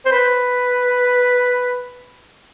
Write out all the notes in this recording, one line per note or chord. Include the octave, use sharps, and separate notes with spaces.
C5
B4